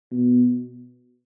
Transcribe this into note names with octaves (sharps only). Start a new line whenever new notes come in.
B2